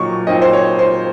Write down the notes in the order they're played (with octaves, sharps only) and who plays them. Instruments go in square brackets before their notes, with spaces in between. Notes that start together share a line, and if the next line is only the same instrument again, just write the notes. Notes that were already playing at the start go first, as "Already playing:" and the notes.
Already playing: [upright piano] A#2 F#3 D#4 C#6
A#2 F#3 C4 D#4 D#5
C5
C#5
C5